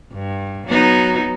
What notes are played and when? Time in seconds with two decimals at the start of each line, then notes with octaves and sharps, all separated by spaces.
0.13 G2
0.67 F#3 B3 D#4